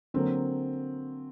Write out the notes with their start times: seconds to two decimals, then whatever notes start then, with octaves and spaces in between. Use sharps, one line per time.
0.14 D3 F#3 A#3 C4